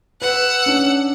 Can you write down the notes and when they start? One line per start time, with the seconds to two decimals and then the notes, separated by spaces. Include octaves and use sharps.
0.22 B4 F#5 E6
0.66 C#4 D4